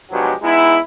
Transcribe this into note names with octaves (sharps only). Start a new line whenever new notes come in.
B2 F3 F#3 G#3 D4 G4
G#3 B3 D#4 E4